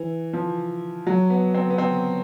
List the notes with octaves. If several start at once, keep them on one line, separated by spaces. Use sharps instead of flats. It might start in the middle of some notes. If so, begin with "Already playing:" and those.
Already playing: E3
F3
F#3
B3
C4
B3
C4